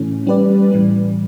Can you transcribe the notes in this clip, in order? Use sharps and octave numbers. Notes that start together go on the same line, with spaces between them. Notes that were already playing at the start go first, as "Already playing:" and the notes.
Already playing: A2 E3 A3 C#4
G3 C#4 G4 B4 D5
A2 E3 G3